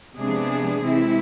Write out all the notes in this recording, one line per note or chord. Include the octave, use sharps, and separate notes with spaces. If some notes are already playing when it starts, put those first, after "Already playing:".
C3 F3 G#3 B3 D4 G#4
C3 E3 G#3 C4 E4